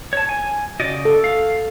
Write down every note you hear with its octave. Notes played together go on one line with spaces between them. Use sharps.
C#5 A5
G#5
C#3 F#4 D5 D#5
A4
F5